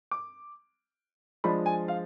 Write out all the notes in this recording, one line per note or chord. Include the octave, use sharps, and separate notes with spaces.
D6
F3 G#3 D4 B5
G#5
F5